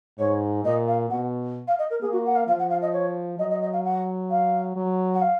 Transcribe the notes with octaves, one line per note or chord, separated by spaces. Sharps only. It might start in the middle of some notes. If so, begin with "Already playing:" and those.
G#2 C#5
A#2 D#5
F5
B2 F#5
F5
D#5
A#4
A#3 G#4
F#4
F#5
F5
F3 F5
F#5
F5
D#5
C#5
F#3 D#5
D#5
D#5
F5
F#5
F5
F#3
F#5
F5